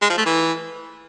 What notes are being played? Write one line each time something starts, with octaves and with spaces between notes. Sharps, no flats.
G#3
F3
A3
E3